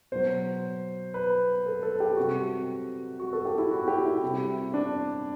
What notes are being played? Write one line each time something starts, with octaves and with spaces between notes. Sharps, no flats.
B2 F#3 C5
B4
A4
A4
G4
C3 G3 F#4
F#4
A4
G4
E4
F#4
G4
E4
C3 G3
D4